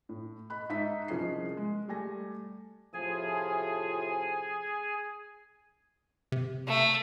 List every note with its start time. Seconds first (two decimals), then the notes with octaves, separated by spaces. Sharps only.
0.09 A2
0.50 D#5 B5 F#6
0.69 G#2 D#4 E5 A5 B6
1.08 C2 F3 C#4 G#4 D#5 C7
1.57 G#3
1.89 G3 A3 G#5 A#6
2.94 A2 C3 F3 G#4 G#5
6.32 C3
6.68 A3